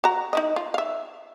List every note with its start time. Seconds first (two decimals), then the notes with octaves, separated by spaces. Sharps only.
0.04 F#4 A#5
0.33 D#4 E4 D#5
0.56 F4
0.74 E5 F5